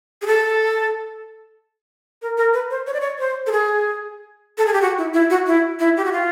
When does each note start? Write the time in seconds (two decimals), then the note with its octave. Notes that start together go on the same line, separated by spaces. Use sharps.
0.22 G#4
0.27 A4
2.22 A#4
2.37 A#4
2.53 B4
2.70 C5
2.87 C#5
2.94 D5
3.01 C#5
3.19 C5
3.47 A4
3.52 G#4
4.58 A4
4.67 G#4
4.73 G4
4.82 F#4
4.98 E4
5.14 E4
5.30 F#4
5.47 E4
5.80 E4
5.97 G4
6.05 F#4
6.12 F4